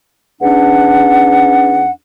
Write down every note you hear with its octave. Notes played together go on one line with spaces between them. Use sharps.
E2 C#4 D4 F#5